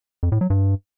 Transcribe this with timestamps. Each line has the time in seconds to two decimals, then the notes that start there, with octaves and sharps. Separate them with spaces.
0.23 F2
0.32 A2
0.41 F#3
0.50 G2